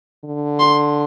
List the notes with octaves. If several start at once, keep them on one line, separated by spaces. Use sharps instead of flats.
D3
C6